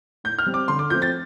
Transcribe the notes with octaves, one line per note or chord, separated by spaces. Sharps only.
A2 G6
F6
G3 C4
D6
D3 C6
D6
F3 A3 C4 G6
A6